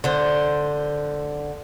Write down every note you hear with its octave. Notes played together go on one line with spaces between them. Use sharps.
D3 C5